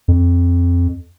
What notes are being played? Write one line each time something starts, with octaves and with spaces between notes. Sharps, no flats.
F2